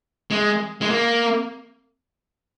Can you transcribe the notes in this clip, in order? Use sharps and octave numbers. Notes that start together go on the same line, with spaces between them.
G#3
G#3
A#3